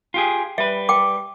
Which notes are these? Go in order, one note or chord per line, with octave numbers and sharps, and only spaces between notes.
F4 G4 G#4
G3 B4 E5
G5 D6